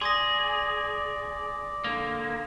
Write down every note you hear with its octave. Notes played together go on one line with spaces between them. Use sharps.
G#4 D5 C6 D#6 A#6
D3 A#3